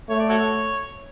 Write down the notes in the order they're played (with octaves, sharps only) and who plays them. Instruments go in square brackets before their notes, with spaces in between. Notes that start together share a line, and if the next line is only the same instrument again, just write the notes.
[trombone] A3 [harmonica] C#5
[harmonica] D5
F#4 A4 C#5